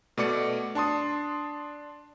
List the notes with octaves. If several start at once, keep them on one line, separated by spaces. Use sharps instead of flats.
B2 A3 D5 D6 C#7
D4 A5 C6 D#6